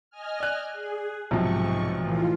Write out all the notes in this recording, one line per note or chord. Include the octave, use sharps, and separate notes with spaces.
D#5 G#5 F6
D5 F#6
G#4
B1 G#2 C3 F3 C#6
A2 E3 F4